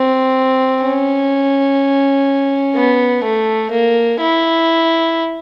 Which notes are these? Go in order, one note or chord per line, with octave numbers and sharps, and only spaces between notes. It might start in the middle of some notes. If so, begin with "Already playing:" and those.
Already playing: C4
C#4
B3
A3
A#3
E4